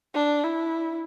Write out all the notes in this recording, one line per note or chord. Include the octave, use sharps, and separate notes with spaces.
D4
E4